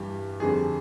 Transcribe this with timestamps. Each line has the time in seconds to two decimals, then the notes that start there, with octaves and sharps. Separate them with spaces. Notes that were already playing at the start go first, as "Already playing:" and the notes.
Already playing: G2 E3 G3 G4
0.40 F2 D3 G3 G#4